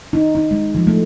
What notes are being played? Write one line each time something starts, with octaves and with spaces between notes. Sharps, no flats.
D#4
D#4
G#3
F3
A3